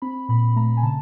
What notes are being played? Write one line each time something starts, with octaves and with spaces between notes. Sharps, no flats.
C4 B5
A#2 B5
A3 A#5
G#5
C#3 A5